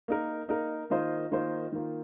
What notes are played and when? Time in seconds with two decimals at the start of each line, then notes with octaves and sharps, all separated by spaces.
0.08 A#3 D#4 A#4
0.49 A#3 D#4 A#4
0.90 D#3 A#3 F4 C5 D#5
1.32 D#3 A#3 F4 C5 D#5
1.72 D#3 A#3 F4